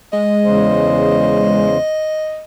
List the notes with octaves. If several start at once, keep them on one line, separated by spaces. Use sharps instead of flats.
G#3 D#5
E2 C#3 C5